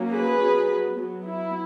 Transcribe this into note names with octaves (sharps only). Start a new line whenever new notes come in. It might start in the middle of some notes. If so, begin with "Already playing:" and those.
Already playing: F#3 A#3 C#4
G#4 B4
F#3 B3
F#3 B3
E4